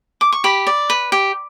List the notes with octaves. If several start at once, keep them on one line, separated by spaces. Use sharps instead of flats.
D6
C#6
G4 B5
D5
B4
G4